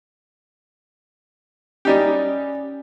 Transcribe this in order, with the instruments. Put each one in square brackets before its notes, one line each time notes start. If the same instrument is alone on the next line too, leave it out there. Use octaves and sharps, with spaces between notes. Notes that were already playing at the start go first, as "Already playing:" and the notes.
[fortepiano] G3 D#4 G4 [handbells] C#4 D5